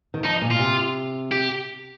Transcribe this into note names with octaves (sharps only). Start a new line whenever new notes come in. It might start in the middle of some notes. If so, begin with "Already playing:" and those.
D#3
F3 D#4
A#2
F4
C3
G4